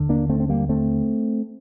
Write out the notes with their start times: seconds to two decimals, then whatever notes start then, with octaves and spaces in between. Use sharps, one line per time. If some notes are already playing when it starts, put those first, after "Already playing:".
Already playing: D#2 D3
0.09 A#3 D4
0.29 A3 C4
0.40 C4
0.49 G3 A#3
0.69 A3 C4